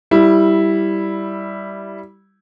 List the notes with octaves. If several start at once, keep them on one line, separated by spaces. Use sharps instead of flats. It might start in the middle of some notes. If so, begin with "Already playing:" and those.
G3 E4